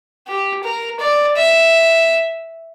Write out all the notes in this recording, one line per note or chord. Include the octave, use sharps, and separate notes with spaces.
G4
A#4
D5
E5